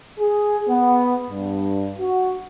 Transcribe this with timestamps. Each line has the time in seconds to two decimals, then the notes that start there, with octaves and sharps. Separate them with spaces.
0.19 G#4
0.68 B3
1.31 G2
1.99 F#4